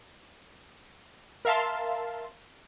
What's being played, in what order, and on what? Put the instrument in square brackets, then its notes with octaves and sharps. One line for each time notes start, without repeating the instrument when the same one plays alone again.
[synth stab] A#4 E5 F5 A5 C6